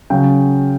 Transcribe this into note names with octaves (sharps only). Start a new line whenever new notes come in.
C#3 F#3 G5